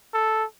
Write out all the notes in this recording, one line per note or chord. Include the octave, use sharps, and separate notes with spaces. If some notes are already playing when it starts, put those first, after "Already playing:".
A4